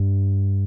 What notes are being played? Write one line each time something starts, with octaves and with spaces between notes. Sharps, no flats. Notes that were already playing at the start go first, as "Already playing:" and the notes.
Already playing: G2